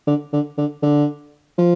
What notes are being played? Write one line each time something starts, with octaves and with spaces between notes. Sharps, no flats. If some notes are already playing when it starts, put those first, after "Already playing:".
D3
D3
D3
D3
F3